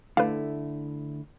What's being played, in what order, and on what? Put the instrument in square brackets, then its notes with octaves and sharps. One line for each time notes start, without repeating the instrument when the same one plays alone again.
[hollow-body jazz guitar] D3 A3 E4 [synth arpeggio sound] B4 F5